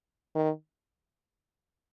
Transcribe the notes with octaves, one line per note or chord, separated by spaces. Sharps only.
D#3